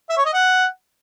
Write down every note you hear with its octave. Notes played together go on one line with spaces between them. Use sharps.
E5
C#5
D#5
F#5